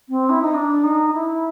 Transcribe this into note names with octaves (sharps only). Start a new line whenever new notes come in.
C4
E4
D#4
D4
D#4
E4